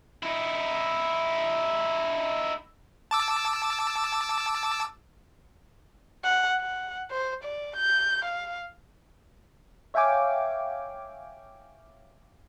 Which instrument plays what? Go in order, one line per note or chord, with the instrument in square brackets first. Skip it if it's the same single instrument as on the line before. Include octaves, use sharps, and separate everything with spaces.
[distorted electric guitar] D#4 E4
[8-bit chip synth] A5 D6 E6
[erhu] F#5
F#5
C5
D5
G6
F5
[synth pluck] C#5 E5 F5 G5 G#5 D6